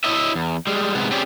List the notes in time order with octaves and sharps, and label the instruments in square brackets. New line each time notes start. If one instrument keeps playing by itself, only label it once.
[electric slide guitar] E4 C#5 D#5 E5
E2
G3 G#3
G#2 C3 G#3 B3
C4 C#4 G4 G#4 D5